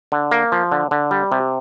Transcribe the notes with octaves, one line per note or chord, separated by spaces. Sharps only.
D3
A#3
F3
D3
D3
G3
C3